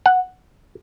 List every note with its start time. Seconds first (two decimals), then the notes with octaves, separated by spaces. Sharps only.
0.06 F#5